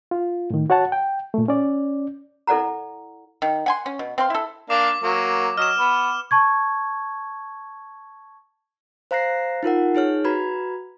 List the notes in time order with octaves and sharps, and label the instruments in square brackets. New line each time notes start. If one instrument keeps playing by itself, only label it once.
[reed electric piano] F4
A2 D#3
F#4 C#5 F#5 A5
G5
A#2 A3
C#4 D5
[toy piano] E4 A4 D5 F#5 A#5
[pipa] D#3
F#5 G#5 C6
C#4
B2
C4 F5 C6
E4 A4
[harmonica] A#3 D4 F5 [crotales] D6
[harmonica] F#3 A#3
[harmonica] F#3 D#5 [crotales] F6 E7
[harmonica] B3 B5
[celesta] A5 C#6 G#6
[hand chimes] C5 F5 A#5 F#6 A#6 C7
D#4 F4 A#4 F#5
D#4 G#4 C#5 F6
F#4 B4 A#5 B5 G#6